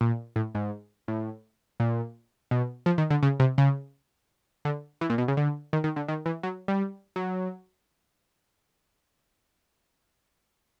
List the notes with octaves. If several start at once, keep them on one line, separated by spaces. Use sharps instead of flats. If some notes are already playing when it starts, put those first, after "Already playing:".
A#2
A2
G#2
A2
A#2
B2
F3
D#3
D3
C#3
C3
C#3
D3
E3
A#2
B2
C#3
D3
D#3
D#3
D3
D#3
E3
F#3
G3
F#3